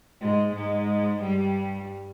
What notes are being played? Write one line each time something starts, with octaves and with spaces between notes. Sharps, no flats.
G#2 G#3
G#2 G#3
G2 G3